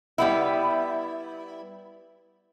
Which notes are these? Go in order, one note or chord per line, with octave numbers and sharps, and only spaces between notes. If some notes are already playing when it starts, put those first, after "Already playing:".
G3 B3 E4